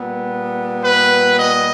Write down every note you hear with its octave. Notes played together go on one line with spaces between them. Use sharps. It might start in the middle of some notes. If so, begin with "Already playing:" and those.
Already playing: A#2 G3 B3
B4
D#5